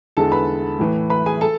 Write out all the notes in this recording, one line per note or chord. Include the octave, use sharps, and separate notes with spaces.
E2 D3 G#3 A4 A5
B4 B5
A2 E3 A3
B4 B5
G#4 G#5
A4 A5